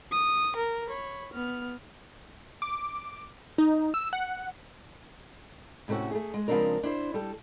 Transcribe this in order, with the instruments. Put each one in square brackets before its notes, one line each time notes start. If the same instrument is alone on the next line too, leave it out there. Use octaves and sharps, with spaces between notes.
[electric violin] D#6
A#4
C#5 B5
B3 F6
[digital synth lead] D6
D#4
E6
F#5
[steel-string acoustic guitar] A2 C3 A3 C#4 F#4
A3 G#4
G#3
C#3 F3 G#3 C4 D4 A#4
D4 E4 C5
G3 A4